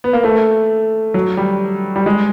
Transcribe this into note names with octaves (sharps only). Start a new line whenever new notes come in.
B3
A#3
A3
F#3
G3
G3
G#3